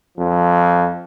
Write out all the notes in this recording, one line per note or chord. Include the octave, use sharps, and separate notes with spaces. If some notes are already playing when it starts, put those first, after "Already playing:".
F2 F3